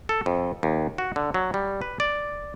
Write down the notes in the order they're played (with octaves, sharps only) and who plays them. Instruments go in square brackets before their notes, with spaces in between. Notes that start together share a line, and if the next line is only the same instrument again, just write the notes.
[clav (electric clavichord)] A4
F2
D#2
F#4
D3
F#3
G3
B4
D5